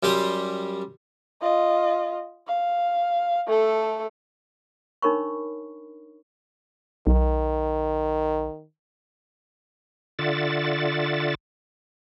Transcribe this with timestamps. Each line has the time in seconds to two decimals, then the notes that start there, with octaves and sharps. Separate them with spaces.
0.03 F#2 G3 G4 C6 D#6
1.42 F4 D#5
2.47 F5
3.47 A3 A4
5.02 D4 D#4 A#4 C#5 B5 C#6
7.07 B1 D#3
10.19 D3 F4 D5 E5 F#5 A6